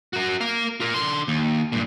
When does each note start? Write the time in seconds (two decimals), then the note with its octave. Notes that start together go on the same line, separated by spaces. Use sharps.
0.13 F#4 A#4
0.41 A#4 F5
0.80 F4 A#4
0.94 D3 C6
1.28 D#2
1.72 G2 A#2